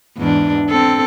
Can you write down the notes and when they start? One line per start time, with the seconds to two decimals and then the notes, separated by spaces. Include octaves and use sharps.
0.18 E2 G#2 D4
0.70 C4 A4